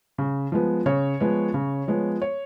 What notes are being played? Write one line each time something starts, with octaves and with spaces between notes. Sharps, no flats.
C#3
F3 G#3 B3
C#3 C#5
F3 G#3 B3
C#3
F3 G#3 B3
C#5